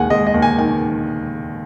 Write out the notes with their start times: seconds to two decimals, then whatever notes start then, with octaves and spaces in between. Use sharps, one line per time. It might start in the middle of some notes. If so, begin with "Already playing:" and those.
Already playing: D#2 G#3 F#5 G#5
0.10 G#3 D#5
0.27 D#5
0.34 D#2
0.42 G#5
0.58 D#3 G#5